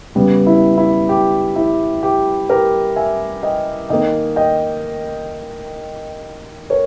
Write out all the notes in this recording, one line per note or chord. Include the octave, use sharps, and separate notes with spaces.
C#3 G3 B3 G4
E4
E4
G4
E4
G4
G4 A#4
E5 G#5
D#5 G5
D#3 A#3 D#5 G5
D#5 G5
A#4 C#5